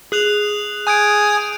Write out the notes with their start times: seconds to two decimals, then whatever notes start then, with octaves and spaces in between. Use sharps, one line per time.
0.12 G#4 D#6 F#6 F7
0.87 G#5 D#6 G6 G#6 D7